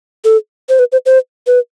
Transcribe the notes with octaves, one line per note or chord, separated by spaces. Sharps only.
A4
C5
B4
C5
C5
B4